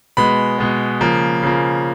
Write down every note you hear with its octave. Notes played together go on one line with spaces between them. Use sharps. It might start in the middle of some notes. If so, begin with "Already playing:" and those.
B2 G#3 B3 B5
B2 G#3 B3
C#3 F3 A#3
C#3 F3 A#3